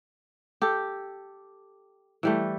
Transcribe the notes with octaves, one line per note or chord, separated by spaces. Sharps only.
G4 A4
E3 G3 A3